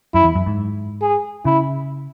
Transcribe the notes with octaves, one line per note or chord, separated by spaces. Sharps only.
F#2 E4
E2
F#2
G#2
G#4
C#3 E4